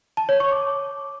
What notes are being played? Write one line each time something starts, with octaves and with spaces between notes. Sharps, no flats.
A5
C#5
C#6
D6